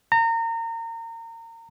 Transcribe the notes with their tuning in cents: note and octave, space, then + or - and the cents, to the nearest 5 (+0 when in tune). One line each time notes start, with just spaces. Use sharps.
A#5 -30